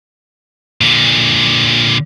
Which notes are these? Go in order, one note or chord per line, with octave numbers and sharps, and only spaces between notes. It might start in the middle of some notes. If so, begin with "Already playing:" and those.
A#2 D3